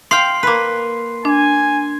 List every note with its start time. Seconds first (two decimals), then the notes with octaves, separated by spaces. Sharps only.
0.11 F5 G5 C6 C7
0.43 A#3 B4
1.25 D4 G#5